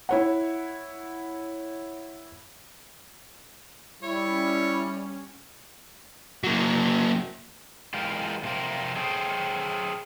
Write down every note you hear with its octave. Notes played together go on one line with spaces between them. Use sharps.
E4 C#5 F#5
G3 E4 C#5
C#4
F#3 A#3
E3 G#3 F4 G4 A#4
F2 C3 F4 G4 A#4
G#4 A4 C5 C#5 G5